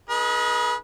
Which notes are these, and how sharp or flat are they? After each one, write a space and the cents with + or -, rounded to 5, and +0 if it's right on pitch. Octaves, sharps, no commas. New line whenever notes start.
D#4 +0 G#4 +30 B4 -35